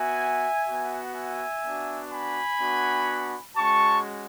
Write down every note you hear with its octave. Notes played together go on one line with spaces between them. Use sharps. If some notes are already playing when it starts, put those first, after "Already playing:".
Already playing: B3 F#4 E5 G#5
B3 F#4
E5 G#5
B3 D4 F#4
G#5 B5
B3 D4 F#4
G#3 C#4 F#4 A5 C#6